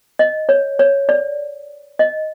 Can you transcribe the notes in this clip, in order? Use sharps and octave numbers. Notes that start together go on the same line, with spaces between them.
D#5
C#5
C#5
D5
D#5